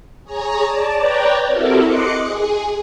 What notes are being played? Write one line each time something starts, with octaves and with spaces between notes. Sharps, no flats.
G#4 C#5 A#5
D5 A5
B4 C#5 D5 G5 A#5
C4 E4 F#4 G4 A4 A#4
D#5 C6 D6 F#6 C#7
G#4